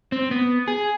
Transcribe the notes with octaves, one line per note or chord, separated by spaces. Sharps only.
C4
B3
G#4